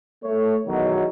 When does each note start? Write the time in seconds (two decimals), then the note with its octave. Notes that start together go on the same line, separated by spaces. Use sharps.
0.23 A3 C#5
0.67 E2 B2 D#3 F#3